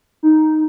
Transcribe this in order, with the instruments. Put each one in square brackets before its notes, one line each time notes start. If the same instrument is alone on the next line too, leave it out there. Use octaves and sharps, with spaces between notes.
[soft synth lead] D#4